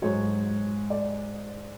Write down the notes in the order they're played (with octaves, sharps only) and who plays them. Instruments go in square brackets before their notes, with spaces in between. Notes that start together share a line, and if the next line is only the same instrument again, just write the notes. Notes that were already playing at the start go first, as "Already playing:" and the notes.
[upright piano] G#2 F#3 C#5
D5